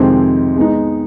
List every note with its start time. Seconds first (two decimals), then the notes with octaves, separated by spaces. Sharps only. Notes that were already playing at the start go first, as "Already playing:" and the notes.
Already playing: F2 C3 D#3 G#3 C4
0.56 G#3 B3 D#4